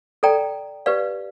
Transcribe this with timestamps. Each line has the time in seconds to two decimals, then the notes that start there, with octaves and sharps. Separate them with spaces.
0.23 A4 D5 G5 A#5
0.86 G4 B4 D5 F5